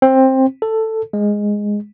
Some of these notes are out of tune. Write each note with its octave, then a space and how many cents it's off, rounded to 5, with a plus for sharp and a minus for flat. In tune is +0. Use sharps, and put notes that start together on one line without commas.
C4 +15
A4 +10
G#3 -5